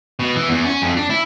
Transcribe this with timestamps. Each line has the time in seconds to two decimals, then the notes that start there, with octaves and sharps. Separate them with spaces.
0.20 B2
0.36 E3
0.49 E2
0.65 C#4
0.82 F2
0.97 D4
1.10 E4